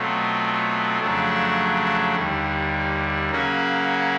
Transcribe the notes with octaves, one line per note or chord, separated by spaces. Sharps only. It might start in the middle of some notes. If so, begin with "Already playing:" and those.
Already playing: B2 F#3 A3 C4 F4
F2 C#3 F#3 A3 D4
D#2 D3 G3
C#3 F#3 A#3 C#4 F#4